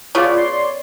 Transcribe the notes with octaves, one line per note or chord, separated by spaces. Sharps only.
C#3 B3 F4 C#5 D5
C6